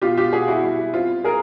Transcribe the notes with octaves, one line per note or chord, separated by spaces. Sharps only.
B2 F4 G4
F4 G4
B2 F#4 G#4
E4 F#4
G3 E4
C4 F4
G#4 A#4